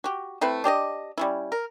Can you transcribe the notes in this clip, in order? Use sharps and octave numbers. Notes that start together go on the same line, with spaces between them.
F#4 G4
A3 C4 E4 B4
D4 G4 D5 D#5
G3 C#4 E4
A#4